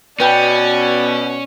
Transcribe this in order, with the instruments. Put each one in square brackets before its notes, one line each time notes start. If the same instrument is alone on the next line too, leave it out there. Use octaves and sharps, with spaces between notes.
[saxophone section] B2 [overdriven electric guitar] C#4 [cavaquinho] B4 G5 [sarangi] D5